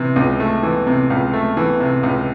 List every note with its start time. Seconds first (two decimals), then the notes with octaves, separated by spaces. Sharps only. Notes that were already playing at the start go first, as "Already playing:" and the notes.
Already playing: C3 E3
0.16 C#2
0.40 A3
0.63 E3
0.87 C3
1.10 C#2
1.33 A3
1.57 E3
1.80 C3
2.03 C#2